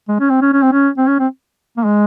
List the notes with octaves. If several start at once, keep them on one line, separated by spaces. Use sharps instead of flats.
G#3
C#4
C4
C#4
C#4
C4
C#4
C4
C#4
C4
A#3
G#3